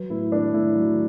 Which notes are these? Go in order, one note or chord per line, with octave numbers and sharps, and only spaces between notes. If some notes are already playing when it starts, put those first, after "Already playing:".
Already playing: F#3 B4
A2 E4
A2 D4
A3 E4
F#3